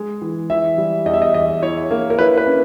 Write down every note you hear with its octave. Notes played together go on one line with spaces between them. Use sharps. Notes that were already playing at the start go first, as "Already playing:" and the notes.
Already playing: G#3
E3
E3 E5
G3
E2 D#5
E5
D#5
E2 D#5
E4 C#5
A#3
A#4
E4 B4
B4
C#4